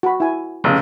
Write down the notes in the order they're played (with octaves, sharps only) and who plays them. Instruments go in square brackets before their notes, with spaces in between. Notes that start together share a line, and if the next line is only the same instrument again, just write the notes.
[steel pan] F#4 B5
E4 G#5
[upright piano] F1 C#3